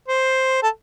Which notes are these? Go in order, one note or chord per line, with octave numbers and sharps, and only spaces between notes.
C5
A4